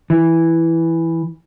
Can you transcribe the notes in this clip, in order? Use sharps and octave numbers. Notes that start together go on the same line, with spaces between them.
E3